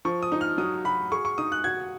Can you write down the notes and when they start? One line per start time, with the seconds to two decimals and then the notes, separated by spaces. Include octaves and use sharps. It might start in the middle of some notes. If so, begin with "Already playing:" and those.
0.05 F3 C#6
0.22 D#6
0.32 D#4
0.41 F6
0.58 F#3 D#6
0.85 F#4 B5
1.12 G#4 C#6
1.25 C#6
1.38 D#4 D#6
1.52 F#6
1.64 F#4 G#6